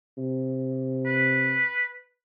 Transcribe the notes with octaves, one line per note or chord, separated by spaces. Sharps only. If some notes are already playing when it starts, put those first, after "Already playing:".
C3
B4